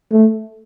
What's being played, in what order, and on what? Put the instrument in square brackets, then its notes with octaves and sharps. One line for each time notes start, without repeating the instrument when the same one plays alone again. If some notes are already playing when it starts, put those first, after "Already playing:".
[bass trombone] A3